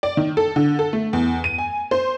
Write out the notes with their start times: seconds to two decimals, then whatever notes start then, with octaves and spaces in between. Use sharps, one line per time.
0.03 D5
0.17 D#3
0.37 A4
0.56 D3
0.79 A4
0.93 A3
1.13 E2
1.44 D#7
1.58 G#5
1.91 C5